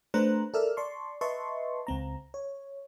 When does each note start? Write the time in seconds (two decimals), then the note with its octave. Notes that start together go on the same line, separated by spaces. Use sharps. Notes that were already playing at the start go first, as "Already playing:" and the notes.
0.14 A3 D4 B4 C5 A#5 F#6
0.54 A4 A#4 D5 E5 E6 F6
0.77 D5 A5 C6 C#6
1.21 B4 D#5 E5 A5 C6 C#6
1.87 C#2 C4 A#5
2.34 C#5